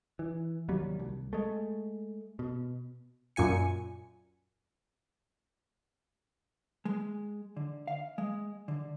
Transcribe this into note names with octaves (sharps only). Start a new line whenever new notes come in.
E3
D#2 C3 F#3 G3
C2
G#3 A3
B2
F#2 A#2 G#5 C#7
G#3
D3
F5
G#3
D3